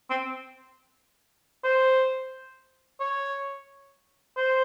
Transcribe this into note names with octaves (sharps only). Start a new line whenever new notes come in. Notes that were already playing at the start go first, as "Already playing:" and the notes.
C4
C5
C#5
C5